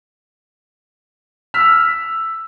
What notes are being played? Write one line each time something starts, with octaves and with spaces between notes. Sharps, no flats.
E6 F6 B6